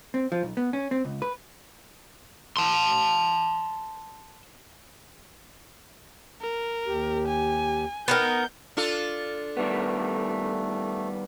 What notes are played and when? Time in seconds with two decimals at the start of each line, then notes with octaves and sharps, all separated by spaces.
0.14 C4
0.32 F3
0.43 B1
0.57 B3
0.73 C#4
0.91 C4
1.05 C#2
1.22 B4
2.57 A5 C6
6.41 A#4
6.86 D#2 G4
7.28 G#5
8.08 B3 D#4 A#4 G6
8.77 D4 F4 A4
9.57 D#3 G3 A3 B3